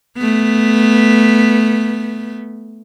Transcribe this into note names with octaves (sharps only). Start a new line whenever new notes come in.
A3 B3